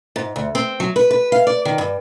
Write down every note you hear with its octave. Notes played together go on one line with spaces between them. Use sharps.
G#2
D2
C4
F#3
B4
B4
F5
D5
D#3
G2